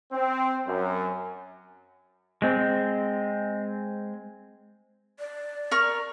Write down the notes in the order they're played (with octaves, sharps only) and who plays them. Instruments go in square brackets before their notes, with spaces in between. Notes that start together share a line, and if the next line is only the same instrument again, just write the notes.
[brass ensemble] C4
F#2
[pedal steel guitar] G#3 C4
[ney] D5
[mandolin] A#4 C#6 F6